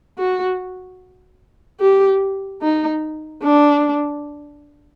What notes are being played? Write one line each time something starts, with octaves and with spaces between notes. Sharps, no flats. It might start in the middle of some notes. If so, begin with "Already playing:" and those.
F#4
G4
D#4
D4